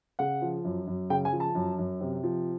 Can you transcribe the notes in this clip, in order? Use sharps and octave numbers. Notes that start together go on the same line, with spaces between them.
C#3 F#5
F3
F#2
F#2
C#3 G5
G#5
F3
A5
F#2
F#2
C3
F3